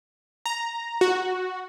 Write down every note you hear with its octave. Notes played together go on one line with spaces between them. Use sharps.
A#5
F#4